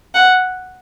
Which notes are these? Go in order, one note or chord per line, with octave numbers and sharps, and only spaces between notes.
F#5